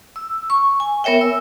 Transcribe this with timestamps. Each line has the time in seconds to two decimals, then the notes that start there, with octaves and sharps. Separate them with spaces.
0.16 E6
0.50 C#6
0.80 G#5
1.04 B3 A#4 C#5 E5 G5
1.21 E6